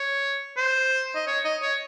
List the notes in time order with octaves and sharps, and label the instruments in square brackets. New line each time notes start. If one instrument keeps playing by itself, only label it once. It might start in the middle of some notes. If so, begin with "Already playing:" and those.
Already playing: [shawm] C#5
C5
D#5
C#5
D#5
C#5